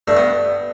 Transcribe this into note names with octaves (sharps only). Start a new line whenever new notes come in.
G2 A3
B3